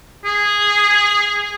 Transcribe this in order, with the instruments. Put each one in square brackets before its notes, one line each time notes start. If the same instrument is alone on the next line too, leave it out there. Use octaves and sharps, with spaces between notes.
[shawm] G#4